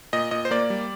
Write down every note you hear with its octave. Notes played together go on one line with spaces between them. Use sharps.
A#2 D#5
A#2 D#5
C5
A#3 D5
G3